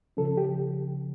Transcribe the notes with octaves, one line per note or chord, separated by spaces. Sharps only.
C#3 F3 C#4 A4
G4